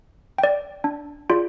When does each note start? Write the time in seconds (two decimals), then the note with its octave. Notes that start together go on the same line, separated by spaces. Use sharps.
0.38 G5
0.43 D5
0.84 D4
1.29 F4 G#4 D5